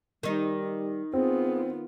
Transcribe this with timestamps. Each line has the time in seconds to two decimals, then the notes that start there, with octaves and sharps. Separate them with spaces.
0.23 D#3 G3 D#4
1.14 B3 C4 F4 G#4